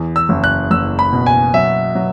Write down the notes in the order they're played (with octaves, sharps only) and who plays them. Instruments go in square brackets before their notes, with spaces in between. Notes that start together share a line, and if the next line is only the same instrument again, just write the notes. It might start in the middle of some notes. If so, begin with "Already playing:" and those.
Already playing: [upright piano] E2
[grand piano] E6
[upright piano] F#1
[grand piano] F#6
[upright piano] F#1 [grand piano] E6
[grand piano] B5
[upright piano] B2
[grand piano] G#5
[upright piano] F#3 [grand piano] E5
[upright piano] F#3